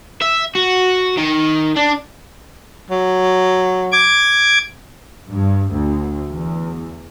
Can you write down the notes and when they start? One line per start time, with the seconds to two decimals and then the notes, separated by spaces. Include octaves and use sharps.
0.22 E5
0.55 F#4
1.17 D#3
1.77 D4
2.90 F#3
3.92 D6 G#6
5.30 G2
5.71 D2
6.32 E2